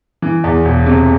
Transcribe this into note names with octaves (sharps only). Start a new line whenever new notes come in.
E3
E2
E1
C3